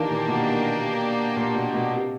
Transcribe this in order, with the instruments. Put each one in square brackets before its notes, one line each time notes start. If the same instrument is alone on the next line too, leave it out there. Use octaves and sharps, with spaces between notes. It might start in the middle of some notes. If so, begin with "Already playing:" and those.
Already playing: [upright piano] D#3 E3 [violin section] A#3 D4 G4
[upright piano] A#2
B2
A#2
B2
B2
C3